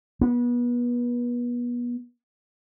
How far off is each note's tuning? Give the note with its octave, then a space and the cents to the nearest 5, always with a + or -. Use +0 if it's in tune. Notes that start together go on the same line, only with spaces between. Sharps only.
B3 -30